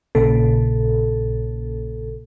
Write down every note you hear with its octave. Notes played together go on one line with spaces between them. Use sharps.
A#1 A#2 C#3 A4